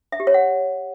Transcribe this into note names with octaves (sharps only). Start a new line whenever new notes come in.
E5
G4
C#5
F#5